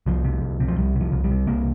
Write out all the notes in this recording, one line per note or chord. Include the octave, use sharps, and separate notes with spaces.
C2 F3
C3
C2
C3
F3
C2 G3
C3
F3
C2
G3
C3
C2 A#3